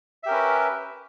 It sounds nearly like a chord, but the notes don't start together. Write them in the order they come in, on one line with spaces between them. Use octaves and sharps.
E5 G4 A#4 C#4 B4